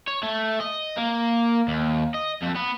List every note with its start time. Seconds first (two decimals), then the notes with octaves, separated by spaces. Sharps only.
0.08 C#5
0.23 A3
0.60 D#5
0.97 A#3
1.68 D#2
2.14 D#5
2.42 F2
2.55 B3